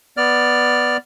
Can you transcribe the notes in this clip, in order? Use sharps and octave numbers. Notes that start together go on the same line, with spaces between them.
B3 D5 F6